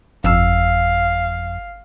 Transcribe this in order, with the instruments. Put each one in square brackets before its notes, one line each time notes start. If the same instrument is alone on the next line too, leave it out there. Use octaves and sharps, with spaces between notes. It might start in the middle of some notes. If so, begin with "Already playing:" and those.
[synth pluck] G1 E6 [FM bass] F2 [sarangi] F5